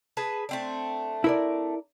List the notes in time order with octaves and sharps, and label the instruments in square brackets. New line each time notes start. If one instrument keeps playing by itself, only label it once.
[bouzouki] G#4 B4 A5
A3 C4 D4
[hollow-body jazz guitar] E4 A#4 D5